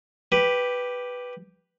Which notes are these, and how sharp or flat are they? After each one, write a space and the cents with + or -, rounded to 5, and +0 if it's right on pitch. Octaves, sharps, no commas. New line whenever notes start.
G4 +0 B4 +0